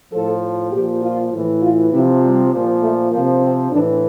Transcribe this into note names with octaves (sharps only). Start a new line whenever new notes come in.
A2 F3 A4
A#2 F3 G4
F4
A2 E3
F4
C3 F3 E4
G3
A#2 F3
A3
C3 F3 A#3
C4
A2 E3 D4